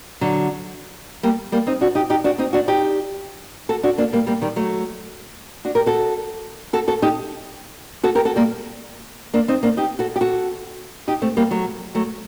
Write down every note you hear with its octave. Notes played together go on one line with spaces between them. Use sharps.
D3 F#3
G3 A#3
G3 A#3
C4 D#4
D4 F#4
D#4 G4
D#4 G4
D4 F#4
C4 D#4
D4 F#4
D#4 G4
F#4 A4
D4 F#4
A#3 D4
G3 A#3
G3 A#3
D#3 G3
F#3 A3
D4 F#4
G4 A#4
F#4 A4
F#4 A4
F#4 A4
D#4 G4
F#4 A4
G4 A#4
F#4 A4
G3 A#3
A#3 D4
C4 D#4
A#3 D4
D#4 G4
F#4 A4
G4
F#4 A4
D#4 G4
A3 C4
G3 A#3
F#3 A3
F#3 A3